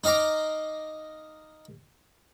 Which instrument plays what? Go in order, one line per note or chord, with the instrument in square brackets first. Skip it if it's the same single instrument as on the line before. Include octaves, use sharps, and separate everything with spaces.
[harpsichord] D#4 D#5 F5 A#5 D6